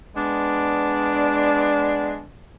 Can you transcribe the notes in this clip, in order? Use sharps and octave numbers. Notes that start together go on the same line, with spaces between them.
G#3 B3 D4